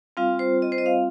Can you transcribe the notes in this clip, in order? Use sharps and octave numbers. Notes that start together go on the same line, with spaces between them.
G3 C4 F4 F5
C5
D#5
C5
D#5
F5